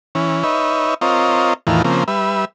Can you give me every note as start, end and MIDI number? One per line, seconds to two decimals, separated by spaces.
0.15 0.43 52
0.15 0.43 61
0.44 0.94 63
0.44 0.94 71
0.44 0.94 73
0.44 0.94 76
1.01 1.54 60
1.01 1.54 65
1.01 1.54 70
1.01 1.54 73
1.01 1.54 75
1.67 1.82 40
1.67 1.82 45
1.67 1.82 51
1.67 1.82 52
1.67 1.82 65
1.67 1.82 70
1.84 2.04 49
1.84 2.04 53
1.84 2.04 58
1.84 2.04 60
2.08 2.45 55
2.08 2.45 71
2.08 2.45 76